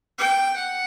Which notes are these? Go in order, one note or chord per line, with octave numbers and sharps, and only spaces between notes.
G5
F#5